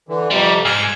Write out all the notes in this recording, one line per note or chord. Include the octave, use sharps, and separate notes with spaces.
D3 E3
F2 C3 G3 D4
G#2 G#5 E6 F6